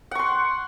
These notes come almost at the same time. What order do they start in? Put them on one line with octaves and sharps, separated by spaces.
F#5 C#6 C6